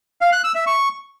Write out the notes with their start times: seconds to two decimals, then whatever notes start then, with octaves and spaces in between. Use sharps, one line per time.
0.21 F5
0.33 F#6
0.44 E6
0.55 E5
0.67 C#6